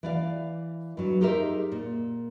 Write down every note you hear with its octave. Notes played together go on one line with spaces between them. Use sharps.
E3 D5 F5
G2 F#3
D#4 G4 G#4 A#4 C5 E5
A#2